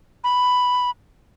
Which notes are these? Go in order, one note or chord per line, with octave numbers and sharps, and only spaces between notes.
B5